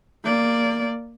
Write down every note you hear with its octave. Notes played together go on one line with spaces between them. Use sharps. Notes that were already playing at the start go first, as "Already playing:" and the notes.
A#3 D5